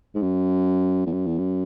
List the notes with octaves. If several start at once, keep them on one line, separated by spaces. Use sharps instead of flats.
G#2
F#2
E2
F#2
E2
F#2